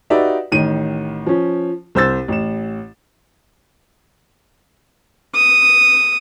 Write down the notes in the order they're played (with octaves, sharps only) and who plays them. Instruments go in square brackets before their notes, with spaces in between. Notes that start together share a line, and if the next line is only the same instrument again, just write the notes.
[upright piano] D#4 F#4 G4 B4 D5 E5
A1 D#3 D#7
F3 C#4
C2 C5 E6 A6
A1 E7
[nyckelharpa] D#6